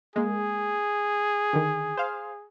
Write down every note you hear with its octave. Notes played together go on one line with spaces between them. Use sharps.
G#3 A#3 G#4
D3 D#3
C5 F5